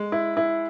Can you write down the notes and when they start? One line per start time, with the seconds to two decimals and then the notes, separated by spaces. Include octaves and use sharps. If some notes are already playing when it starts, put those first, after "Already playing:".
Already playing: G#3
0.12 E4
0.37 E4